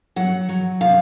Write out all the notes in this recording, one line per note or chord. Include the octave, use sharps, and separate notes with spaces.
F#3 F#5
F#3
C3 F5